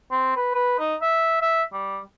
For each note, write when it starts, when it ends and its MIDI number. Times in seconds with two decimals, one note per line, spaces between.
0.11 0.34 60
0.37 0.51 71
0.55 0.76 71
0.80 0.95 63
1.02 1.39 76
1.41 1.63 76
1.73 2.00 55